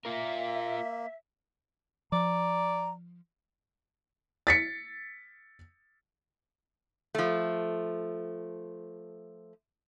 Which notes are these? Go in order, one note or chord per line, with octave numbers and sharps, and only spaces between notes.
A#3 F4 A#4 E5
F3 D5 A#5
A6 B6 C#7
F3 A3